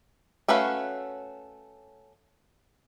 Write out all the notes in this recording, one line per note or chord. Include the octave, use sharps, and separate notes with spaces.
A3 C#4 F#4 B4 F5